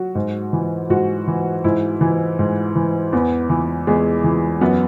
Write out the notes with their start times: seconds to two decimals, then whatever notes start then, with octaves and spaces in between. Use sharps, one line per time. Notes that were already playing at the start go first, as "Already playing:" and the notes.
Already playing: F#3 F#4
0.15 G#2
0.53 E3
0.90 G#2 F#4
1.28 E3
1.64 G#2 E4
2.01 E3
2.39 G#2
2.75 E3
3.12 E2 B3
3.49 E3
3.87 E2 G#3
4.24 E3
4.61 F#2 B3